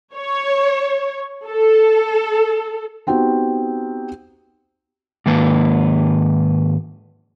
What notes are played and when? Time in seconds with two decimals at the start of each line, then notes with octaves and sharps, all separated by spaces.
0.14 C#5
1.46 A4
3.07 B3 C4 D#4 F#4 G4
5.26 G#2 D#3 A#3 B4